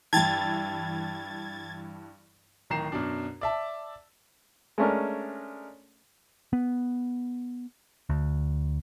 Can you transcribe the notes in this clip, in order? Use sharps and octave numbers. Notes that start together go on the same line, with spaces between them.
G2 E3 G5 A5 G#6 A6
D1 D#3 A#5 C7 E7
F#2 B2 D4
D5 E5 A5
G#3 A3 C#4 D4 A#4
B3
D2